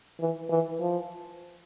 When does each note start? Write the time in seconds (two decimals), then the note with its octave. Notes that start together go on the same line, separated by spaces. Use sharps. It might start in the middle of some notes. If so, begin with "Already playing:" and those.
0.20 E3
0.50 E3
0.80 F3